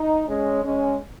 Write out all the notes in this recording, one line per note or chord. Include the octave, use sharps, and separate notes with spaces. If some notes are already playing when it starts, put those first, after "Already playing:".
Already playing: D#4
G#3 C#4
G#3 C#4